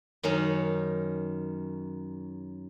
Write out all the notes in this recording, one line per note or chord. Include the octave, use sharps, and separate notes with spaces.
F#2 D#3 C#4 D#4